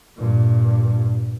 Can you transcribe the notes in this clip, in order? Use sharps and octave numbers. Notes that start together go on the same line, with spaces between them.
G2 A#2